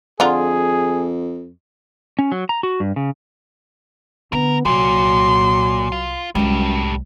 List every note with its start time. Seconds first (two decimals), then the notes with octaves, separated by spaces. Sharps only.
0.20 F2 D3 F4 G#4 A#5
2.19 C#4
2.32 F#3
2.49 A#5
2.63 F#4
2.80 G2
2.96 C#3
4.33 D3 B3 A#4 A#5
4.65 C2 A#2 F#3 C6
5.92 F4
6.35 C2 F#2 A2 G3 G#3